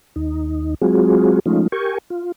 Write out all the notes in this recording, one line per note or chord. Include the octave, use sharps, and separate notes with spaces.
D#2 D#4
F#3 G#3 C4 F4 F#4 G#4
F3 G#3 A3 C#4 D#4 F4
G4 A#4 G5 G#5 C#6
F4